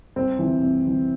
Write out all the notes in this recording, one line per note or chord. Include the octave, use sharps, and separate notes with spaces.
C2 C4
C3 E3
C2
C3 E3